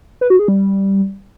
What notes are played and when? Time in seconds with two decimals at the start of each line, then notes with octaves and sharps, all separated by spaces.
0.21 B4
0.30 F#4
0.39 G#4
0.48 G3